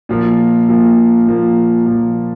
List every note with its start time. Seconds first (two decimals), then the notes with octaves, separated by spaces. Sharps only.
0.09 A#2 F3 A#3
0.69 A#2 F3 A#3
1.27 A#2 F3 A#3
1.86 A#2 F3 A#3